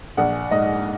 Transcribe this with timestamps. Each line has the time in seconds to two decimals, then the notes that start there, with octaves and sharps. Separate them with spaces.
0.17 A#1 F#5
0.51 G#2 D#5